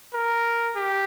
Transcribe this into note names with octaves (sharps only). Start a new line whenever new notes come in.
A#4
G4